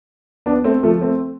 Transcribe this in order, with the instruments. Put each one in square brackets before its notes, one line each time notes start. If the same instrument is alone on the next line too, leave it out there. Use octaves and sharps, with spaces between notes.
[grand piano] B3 D4
A3 C4
F3 A3
A3 C4